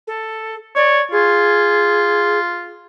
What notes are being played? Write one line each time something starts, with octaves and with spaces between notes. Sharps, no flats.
A4
C#5 D5
F4 G#4